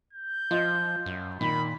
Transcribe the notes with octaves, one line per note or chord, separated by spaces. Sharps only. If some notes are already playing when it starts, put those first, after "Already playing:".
G6
F3 F4 D#5
F#2
A#2 D#3 B5